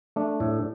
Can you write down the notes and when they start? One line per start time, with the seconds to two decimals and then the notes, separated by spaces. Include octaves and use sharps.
0.16 A3 D4
0.40 A2